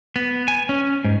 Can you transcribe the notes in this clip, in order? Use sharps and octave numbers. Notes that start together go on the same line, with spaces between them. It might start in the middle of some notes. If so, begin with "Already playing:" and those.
B3
G#5
C#4
G#2